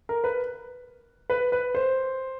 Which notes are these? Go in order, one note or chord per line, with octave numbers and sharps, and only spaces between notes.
A#4
B4
B4
B4
C5